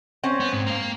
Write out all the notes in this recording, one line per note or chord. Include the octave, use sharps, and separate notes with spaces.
C4 C#4 C5
B3
G#2
A#3 F5